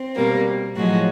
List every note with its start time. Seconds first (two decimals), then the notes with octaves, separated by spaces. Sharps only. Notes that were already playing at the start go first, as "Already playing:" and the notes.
Already playing: C4
0.16 B2 G3 A#3
0.75 A2 F3 F#3 G#3 F#4